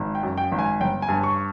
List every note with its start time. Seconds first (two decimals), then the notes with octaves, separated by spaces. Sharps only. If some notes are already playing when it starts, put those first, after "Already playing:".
Already playing: G#1
0.15 G5
0.23 F#2
0.38 G5
0.52 G#1
0.59 G#5
0.80 G1 G5
1.02 G#5
1.09 G2
1.23 C#6